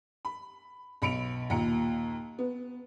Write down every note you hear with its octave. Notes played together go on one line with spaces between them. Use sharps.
B5
B1 B5 C#7 D7 F7
D#2 A#2 A#5 C#7
B3